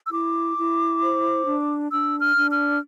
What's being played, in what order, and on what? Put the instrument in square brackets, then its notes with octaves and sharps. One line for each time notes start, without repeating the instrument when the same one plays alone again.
[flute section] E6
E4 D6
E4
C5
D4
D4 E6
F6
D4
F6